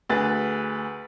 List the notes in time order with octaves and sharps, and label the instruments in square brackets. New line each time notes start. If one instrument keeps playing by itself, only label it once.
[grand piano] D2 G#4 B4 A6